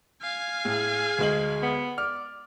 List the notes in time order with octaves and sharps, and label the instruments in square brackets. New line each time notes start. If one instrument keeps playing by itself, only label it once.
[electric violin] F5 G#5
[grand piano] A2 [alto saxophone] G#4
[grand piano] D2 G#3 F#7
[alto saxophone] B3
[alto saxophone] D5 [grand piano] F6